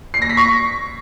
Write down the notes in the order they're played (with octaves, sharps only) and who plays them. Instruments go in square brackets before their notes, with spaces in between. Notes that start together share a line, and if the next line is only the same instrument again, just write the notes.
[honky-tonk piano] C7
A#6
B6
C#6